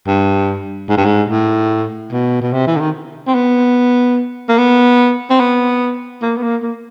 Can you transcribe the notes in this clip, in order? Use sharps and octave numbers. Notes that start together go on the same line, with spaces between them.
G2
G#2
G2
G#2
A2
B2
B2
C3
E3
D3
D#3
C4
B3
A#3
B3
C4
B3
A#3
B3
A#3
A#3